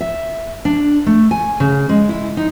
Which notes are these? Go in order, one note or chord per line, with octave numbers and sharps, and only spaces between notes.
E5
D4
A3
G#5
C#3
G#3
E4
D#4